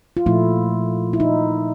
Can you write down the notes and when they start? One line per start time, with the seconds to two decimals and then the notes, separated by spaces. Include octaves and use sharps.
0.17 F4
0.26 A#2 F3 A3 E4
1.13 E4
1.20 D#4